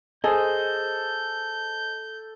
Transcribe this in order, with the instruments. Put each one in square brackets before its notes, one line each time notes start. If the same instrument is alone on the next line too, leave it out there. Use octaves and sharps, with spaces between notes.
[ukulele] G#4 [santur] A4 [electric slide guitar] C5 D#5 [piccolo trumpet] G6